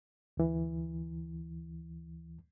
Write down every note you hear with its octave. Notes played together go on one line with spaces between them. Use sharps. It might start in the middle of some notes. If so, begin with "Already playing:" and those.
D2 E3